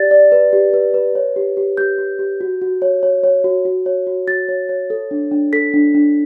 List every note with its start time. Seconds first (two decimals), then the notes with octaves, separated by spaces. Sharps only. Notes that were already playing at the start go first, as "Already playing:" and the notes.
Already playing: G4 D5 A6
0.11 D5
0.32 B4
0.53 G4
0.74 B4
0.94 B4
1.15 C#5
1.36 G4
1.57 G4
1.77 G4 G6
1.98 G4
2.19 G4
2.41 F#4
2.62 F#4
2.82 C#5
3.03 C#5
3.24 C#5
3.44 F#4
3.65 F#4
3.86 C#5
4.07 F#4
4.28 F#4 A6
4.49 C#5
4.69 C#5
4.90 A4
5.11 D4
5.32 D4
5.53 A4 B6
5.74 D4
5.94 D4